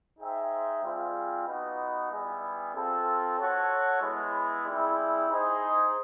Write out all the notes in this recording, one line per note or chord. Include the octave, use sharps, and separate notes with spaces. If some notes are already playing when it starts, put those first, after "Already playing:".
D#4 G#4 C5 E5 G5
G3 C4 F4 G#4
B3 D#4 F#4 B4 D#5
G3 B3 E4 G#4
C4 F4 A4
F#4 A4 C#5
G#3 B3 E4
G3 C4 E4 G#4
D#4 G#4 C5 D#5